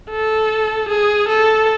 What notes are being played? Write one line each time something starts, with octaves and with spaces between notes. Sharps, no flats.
A4
G#4
A4